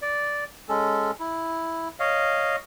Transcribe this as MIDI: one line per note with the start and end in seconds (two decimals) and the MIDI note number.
0.02 0.44 74
0.69 1.11 56
0.69 1.11 61
0.69 1.11 69
1.20 1.88 64
2.00 2.56 73
2.00 2.56 75
2.00 2.56 77